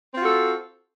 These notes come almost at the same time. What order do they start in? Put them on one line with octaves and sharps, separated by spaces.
C4 F4 F#4 A4